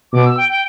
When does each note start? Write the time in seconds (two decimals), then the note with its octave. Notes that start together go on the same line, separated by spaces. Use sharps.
0.13 B2 D6
0.25 E6
0.37 G5
0.49 G5